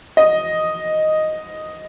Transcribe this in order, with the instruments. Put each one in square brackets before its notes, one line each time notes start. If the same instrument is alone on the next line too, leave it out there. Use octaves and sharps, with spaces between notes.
[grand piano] D#5